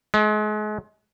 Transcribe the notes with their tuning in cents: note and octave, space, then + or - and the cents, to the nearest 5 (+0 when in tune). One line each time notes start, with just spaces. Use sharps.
G#3 +35